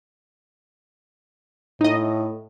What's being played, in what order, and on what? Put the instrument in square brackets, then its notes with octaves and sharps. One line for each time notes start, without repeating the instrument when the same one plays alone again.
[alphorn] A2 [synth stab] D#4 D#5